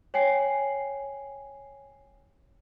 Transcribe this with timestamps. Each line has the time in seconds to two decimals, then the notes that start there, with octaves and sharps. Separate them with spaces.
0.14 C#5 G5 G#5 C7